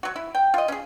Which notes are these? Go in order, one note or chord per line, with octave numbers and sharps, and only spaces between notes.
F#3 F#4
E4
G5
F4 D#5
C#4 G#4